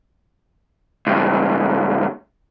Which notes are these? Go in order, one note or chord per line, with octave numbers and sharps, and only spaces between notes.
C#2 G2